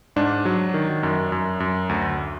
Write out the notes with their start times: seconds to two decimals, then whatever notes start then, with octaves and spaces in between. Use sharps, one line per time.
0.16 G#2 D4
0.45 F#3
0.74 D#3
1.03 F#2
1.32 F#2
1.60 F#2
1.89 D2